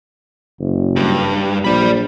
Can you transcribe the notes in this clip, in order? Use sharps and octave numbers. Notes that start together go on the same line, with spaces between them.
F#1
G2
A#1 D5 B5